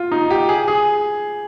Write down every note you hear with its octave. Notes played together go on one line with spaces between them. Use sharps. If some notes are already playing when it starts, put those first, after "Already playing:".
Already playing: F4
D#4
G4
G#4
G#4